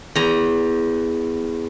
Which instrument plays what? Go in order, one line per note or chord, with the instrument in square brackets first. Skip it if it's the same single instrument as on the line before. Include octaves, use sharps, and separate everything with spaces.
[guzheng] E2 A#5